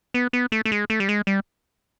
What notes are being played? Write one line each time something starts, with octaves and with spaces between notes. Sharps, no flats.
B3
B3
A3
A3
G#3
A3
G3
G#3
G3